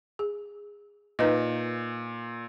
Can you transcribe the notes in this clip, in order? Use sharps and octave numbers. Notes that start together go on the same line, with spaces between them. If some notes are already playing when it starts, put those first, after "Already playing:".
G#4
A#2 D#4 B4 D#5